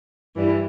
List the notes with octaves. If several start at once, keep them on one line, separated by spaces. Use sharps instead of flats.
G2 E3 G3